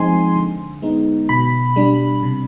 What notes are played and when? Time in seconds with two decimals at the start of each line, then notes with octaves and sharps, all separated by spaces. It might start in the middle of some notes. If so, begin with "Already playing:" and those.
Already playing: F3 G#3 C4 D#4 G#5 C6
0.36 D3
0.82 G#3 B3 D#4
1.29 B2 B5
1.76 G3 D4
2.23 C3